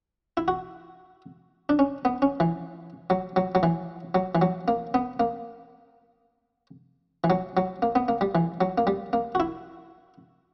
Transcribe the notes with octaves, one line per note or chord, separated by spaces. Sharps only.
E4
F#4
D4
C#4
B3
C#4
E3
F#3
F#3
F#3
E3
F#3
E3
F#3
A#3
B3
A#3
E3
F#3
F#3
A#3
B3
A#3
G3
E3
F#3
A#3
G3
A#3
F#4
E4